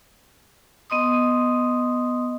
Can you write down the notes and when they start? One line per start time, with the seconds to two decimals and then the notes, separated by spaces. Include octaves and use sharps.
0.90 B3 D#5 C6 D#6